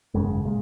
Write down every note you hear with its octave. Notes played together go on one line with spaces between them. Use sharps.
G#1 F#2 C#3 G#3
A#2 G#3